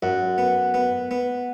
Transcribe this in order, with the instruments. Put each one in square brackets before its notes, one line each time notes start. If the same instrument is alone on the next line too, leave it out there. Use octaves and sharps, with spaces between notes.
[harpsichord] F#2 [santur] F#5
[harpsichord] B3
B3
B3